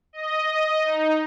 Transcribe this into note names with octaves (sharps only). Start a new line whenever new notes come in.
D#5
D#4